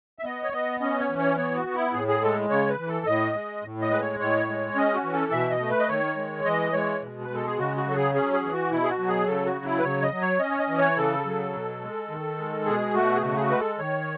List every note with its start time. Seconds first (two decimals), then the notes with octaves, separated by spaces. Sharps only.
0.19 E5
0.24 B3 D#5
0.43 C#5
0.53 B3 D#5
0.80 C#4 D#5
1.00 C#5
1.09 E3
1.19 C#5
1.37 B3 C#5
1.56 F#4
1.65 B3
1.75 E4
1.93 A2 G#4
2.08 G#4
2.22 G#3 A4
2.50 C#3 C#5
2.69 B4
2.78 E3
2.88 A4
3.06 A2 D#5
3.35 G#3
3.63 A2
3.82 D#5
3.91 G#3 B4
4.01 C#5
4.19 A2 C#5
4.48 G#3
4.76 C#4 D#5
4.95 F#4
5.04 E3
5.13 A4
5.32 B2 E5
5.50 D#5
5.60 A3
5.70 B4
5.80 D#5
5.89 D#3 C#5
6.17 G#3
6.44 E3 D#5
6.73 G#3 C#5
7.02 B2
7.24 G#3 B4
7.35 A4
7.47 G#4
7.58 C#3 F#4
7.77 F#4
7.87 F#3 A4
7.96 G#4
8.15 C#4 G#4
8.33 G#4
8.42 E3
8.52 F#4
8.71 B2 E4
8.83 G#4
8.90 F#4
8.98 F#3
9.08 G#4
9.27 C#3 A4
9.46 F#4
9.56 F#3
9.65 E4
9.79 B4
9.84 C#3 C#5
10.02 D#5
10.11 F#3
10.21 C#5
10.40 C#4 D#5
10.51 C#5
10.59 D#5
10.68 E3
10.78 C#5
10.96 C#3 A4
11.25 F#3
11.53 B2
11.81 G#3
12.09 D#3
12.38 G#3
12.65 B2 G#4
12.94 A3 F#4
13.15 G#4
13.22 C#3 F#4
13.37 G#4
13.40 F#4
13.50 G#3 B4
13.60 A4
13.79 D#3 C#5